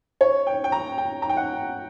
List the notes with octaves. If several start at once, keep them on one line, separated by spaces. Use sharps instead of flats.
C#5
G5
G5
A#5
G5
A#5
G5
F#5